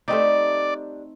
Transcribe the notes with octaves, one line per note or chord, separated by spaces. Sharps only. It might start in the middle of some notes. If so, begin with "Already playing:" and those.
G3 A3 C4 D4 D#4 D5